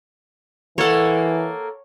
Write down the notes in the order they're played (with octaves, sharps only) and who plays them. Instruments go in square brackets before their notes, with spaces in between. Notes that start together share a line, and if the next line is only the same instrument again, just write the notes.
[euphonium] E3 [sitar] A#3 A4 [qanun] C#5 F#5